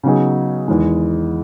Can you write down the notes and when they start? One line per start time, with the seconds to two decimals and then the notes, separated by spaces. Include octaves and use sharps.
0.03 C#3 F#3 B3 D#4 G#4
0.68 E2 D#3 G#3